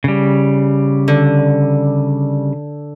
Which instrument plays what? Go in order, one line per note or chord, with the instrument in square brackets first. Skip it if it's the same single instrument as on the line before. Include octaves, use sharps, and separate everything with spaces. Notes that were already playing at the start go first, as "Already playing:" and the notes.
[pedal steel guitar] C#3 G3
[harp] D3